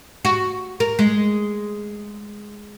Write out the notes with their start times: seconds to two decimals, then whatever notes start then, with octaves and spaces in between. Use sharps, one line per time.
0.25 F#4
0.80 A#4
0.99 G#3